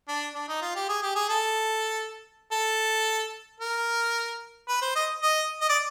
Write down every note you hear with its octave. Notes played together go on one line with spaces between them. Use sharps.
D4
D4
D#4
F4
G4
G#4
G4
G#4
A4
A4
A#4
B4
C5
D#5
D#5
D#5
D5